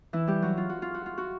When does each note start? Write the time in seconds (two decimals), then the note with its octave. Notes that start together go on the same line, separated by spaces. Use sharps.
0.13 E3 E4
0.27 G3 G4
0.42 F#3 F#4
0.57 F4
0.69 F#4
0.82 F4
0.94 F#4
1.06 F4
1.18 F#4